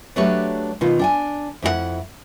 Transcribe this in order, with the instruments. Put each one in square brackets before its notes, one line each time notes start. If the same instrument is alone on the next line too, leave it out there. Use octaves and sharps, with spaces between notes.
[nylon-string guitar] F#3 A3 D4 G4 B4 C#5
B2 D#3 F4
D4 G5 G#5
F2 E4 G4 F#5